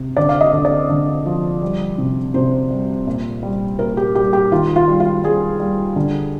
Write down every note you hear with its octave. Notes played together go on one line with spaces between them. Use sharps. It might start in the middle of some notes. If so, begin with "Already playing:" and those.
Already playing: C3
D3 D5
F5
D#5
D3
D5
D3
F3
G3
C3
C3 C5
G3
A#2
G3
A#2 A#4
G4
G3 G4
G4
D#3 F4
F4
G3
F4
G3 G#4
G3
D3